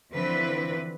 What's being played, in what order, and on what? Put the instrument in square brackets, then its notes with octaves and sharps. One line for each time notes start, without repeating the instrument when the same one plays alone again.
[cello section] D3 E3 F3 C4 E4 B4